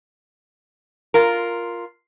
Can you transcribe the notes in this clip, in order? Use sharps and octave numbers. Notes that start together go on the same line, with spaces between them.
F4 A#4